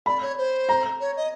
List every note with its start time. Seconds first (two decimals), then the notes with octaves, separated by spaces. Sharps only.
0.06 D5 B5
0.21 C#5
0.38 C5
0.69 A#5
1.00 C#5
1.17 D#5